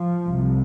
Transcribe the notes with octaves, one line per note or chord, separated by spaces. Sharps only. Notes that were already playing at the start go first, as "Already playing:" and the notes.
Already playing: F3
C2 C3